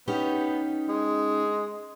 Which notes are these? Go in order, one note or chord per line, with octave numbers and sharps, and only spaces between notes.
B3 C#4 D#4 G4
G#3